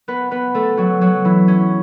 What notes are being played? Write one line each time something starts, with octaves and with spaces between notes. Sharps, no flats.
B3 B4
B3 B4
A3 A4
F#3 F#4
F#3 F#4
E3 E4
C#4